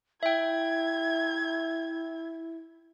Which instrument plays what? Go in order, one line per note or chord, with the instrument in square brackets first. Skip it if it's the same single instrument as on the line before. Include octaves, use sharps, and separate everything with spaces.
[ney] E4 [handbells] E5 G5 [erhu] G#6